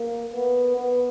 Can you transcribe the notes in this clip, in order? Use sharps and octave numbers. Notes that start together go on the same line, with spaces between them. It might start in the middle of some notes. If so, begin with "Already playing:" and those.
Already playing: A#3
B3
B3